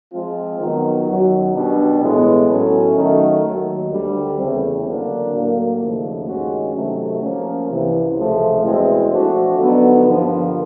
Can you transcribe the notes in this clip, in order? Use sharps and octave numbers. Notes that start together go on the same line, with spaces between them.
F3 G#3 C4 F4
D#3 F#3 B3
F#2 D#3 F#3
B2 G3 B3 D4
A2 E3 G#3 B3
A2 F#3 A3 C#4
D#3 F#3 A3
D#2 D#3 F#3
D2 D3 G3
E2 C#3 E3 A3 C4
D3 F#3 A#3 D4
A2 F#3 A#3
D#2 C#3 F3 A3
G2 D#3 G#3 C#4 F#4
C3 D#3 F#3 A3
F3 A#3 C#4
C2 C3 E3
C#2 C3 F3 A3
E2 B2 G#3 C4 E4
F3 A3 D4 F#4
D3 F#3 B3 D#4
G2 D3 F3 A#3